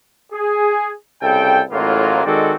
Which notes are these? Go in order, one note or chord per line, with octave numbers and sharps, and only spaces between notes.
G#4
C2 C#3 A4 G5
A1 A2 F#3 G#3 A#3 F4
D#3 G#3 C4 F#4 A4 D5